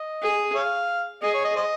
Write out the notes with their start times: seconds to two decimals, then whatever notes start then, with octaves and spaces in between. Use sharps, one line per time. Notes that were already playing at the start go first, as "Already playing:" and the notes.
Already playing: D#5
0.22 G#4
0.55 C#5 F5
1.22 G#4 D#5
1.34 C#5
1.44 D#5
1.56 C5 D#5